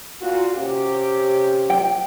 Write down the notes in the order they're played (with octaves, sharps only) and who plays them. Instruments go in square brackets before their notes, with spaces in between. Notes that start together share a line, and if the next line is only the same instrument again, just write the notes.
[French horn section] A#2 F4 F#4
C3 C#4 G4
[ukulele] G5